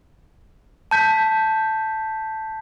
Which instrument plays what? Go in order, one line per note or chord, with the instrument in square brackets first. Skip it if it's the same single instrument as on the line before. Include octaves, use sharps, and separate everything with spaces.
[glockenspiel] A5 G6 B6